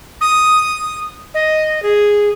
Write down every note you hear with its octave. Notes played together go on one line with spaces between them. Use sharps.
D#6
D#5
G#4